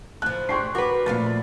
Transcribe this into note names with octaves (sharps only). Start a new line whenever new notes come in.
A2 F3 F#6
D4 G4 G#4 C6 C#6 C7
F#4 A#4 B4 D6
A#2 F3 A3 F5 A6
B5